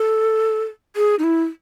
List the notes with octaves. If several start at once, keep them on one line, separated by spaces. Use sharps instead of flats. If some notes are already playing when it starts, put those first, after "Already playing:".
Already playing: A4
G#4
D#4
E4